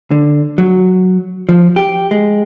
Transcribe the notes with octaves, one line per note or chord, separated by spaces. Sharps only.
D3
F#3
F3
G4
G#3